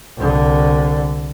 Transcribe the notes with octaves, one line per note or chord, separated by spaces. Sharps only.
C2 D3